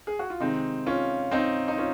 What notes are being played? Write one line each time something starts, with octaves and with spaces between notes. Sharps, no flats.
G#4
F#4
F4
C3 D#3 G#3 C4 D#4
C#4 F4
C4 D#4
D#4
C#4 F4